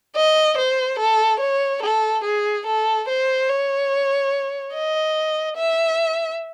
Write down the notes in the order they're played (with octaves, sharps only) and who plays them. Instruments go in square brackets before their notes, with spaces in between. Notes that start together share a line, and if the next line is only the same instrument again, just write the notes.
[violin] D#5
C5
A4
C#5
A4
G#4
A4
C5
C#5
D#5
E5